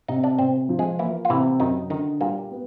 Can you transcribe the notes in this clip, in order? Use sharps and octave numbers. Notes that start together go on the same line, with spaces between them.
C3 D#4 D#5
D4 D5
C3 C4 C5
F3
G#3 G#4
E3 A#3 E4
F4
C3 E3 E4
F#2 D#3 D#4
D3 D#3 D#4
A#2 G3 A#3
B3